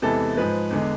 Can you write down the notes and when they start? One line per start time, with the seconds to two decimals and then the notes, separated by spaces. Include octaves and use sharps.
0.02 E2 C3 E3 G#3 A4
0.37 G#2 F3 G#3 B4
0.71 E2 D3 G#3